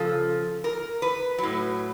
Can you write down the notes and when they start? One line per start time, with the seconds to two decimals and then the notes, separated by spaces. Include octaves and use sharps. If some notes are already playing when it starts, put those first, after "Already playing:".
Already playing: C#3 F3 A4
0.64 A#4
1.02 B4
1.38 A2 F#3